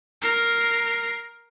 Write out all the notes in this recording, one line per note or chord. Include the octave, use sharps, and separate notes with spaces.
A#4 C7